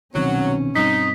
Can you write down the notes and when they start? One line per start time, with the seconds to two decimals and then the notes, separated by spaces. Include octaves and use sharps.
0.15 C2 B2 D#3 F#3 C4 C#4
0.76 G2 G3 C4 D#4 B6